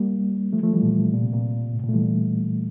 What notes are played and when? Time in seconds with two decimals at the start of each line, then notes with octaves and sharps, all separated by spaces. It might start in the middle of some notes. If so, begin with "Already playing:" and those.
Already playing: G3 A#3
0.53 F3 A3
0.63 F3 A3
0.73 E3 G3
0.83 A#2
1.13 A#2
1.23 C3
1.33 A#2
1.73 A2
1.84 A#2
1.88 A3
1.94 E3 G3